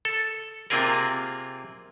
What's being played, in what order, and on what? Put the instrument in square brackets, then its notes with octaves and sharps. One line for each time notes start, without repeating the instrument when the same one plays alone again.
[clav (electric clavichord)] A4
C3 A#3 C4 F4 G#4 A#4